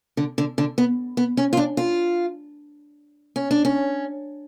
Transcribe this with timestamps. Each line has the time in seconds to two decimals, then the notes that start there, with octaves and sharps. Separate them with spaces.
0.17 D3
0.38 D3
0.58 D3
0.78 B3
1.17 B3
1.37 C#4
1.53 F4
1.57 D4
1.77 F4
3.36 C#4
3.51 D4
3.65 C#4